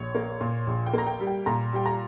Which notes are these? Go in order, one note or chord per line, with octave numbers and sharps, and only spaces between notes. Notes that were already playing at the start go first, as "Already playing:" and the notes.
Already playing: A#1 C#5
A#3
A#2
A#1
G5
A#3 A#5
G5
G3
G5
A#2 A#5
G3 G5
A#5